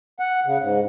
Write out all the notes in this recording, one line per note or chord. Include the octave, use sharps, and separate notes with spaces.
F#5
C#3
G#2